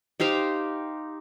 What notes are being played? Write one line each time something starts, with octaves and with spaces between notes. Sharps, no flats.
D#4 G4 C5 F5